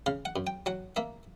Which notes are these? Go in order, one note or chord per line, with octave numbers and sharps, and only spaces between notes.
C#3 F5
F#5
F#2
G5
F#3 F#5
A#3 E5